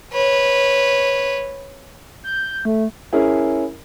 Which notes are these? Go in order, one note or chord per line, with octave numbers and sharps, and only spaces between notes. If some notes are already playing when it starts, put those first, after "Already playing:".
B4 C#5
G6
A3
C#4 E4 G#4 A#4